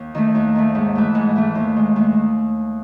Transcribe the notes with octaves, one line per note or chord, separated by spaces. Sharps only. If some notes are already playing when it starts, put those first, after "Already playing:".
Already playing: D#2
D#3 A3
D#2
D#3 A3
G#2
E3 A3
G#2
E3 A3
D#2
D#3 G#3
D#2